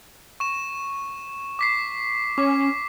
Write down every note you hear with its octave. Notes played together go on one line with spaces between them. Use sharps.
C#6 E7
D6 B6 C7
C#4 D6